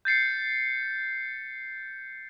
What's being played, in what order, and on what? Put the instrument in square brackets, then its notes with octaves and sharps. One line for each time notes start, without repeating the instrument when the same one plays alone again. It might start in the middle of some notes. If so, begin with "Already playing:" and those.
[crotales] G6 A6 C7 C#7